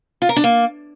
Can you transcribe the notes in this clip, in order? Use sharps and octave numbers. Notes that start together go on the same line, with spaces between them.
F4
A#4
D4
A#3